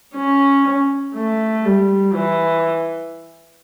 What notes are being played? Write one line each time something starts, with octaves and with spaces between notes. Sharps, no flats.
C#4
A3
G3
E3